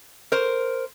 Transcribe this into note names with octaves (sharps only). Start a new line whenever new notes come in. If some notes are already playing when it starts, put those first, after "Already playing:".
A#4 C5